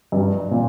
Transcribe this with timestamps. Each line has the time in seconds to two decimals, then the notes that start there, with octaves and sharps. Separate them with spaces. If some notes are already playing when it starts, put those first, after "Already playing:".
0.12 G2
0.51 A#2